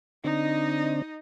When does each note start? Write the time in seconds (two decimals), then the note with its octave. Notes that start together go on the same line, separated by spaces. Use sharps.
0.24 D3 C4 D4 D#4 D#5